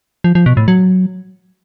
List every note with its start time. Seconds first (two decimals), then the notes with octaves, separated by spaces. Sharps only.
0.24 F3
0.35 F3
0.46 B2
0.57 A2
0.68 F#3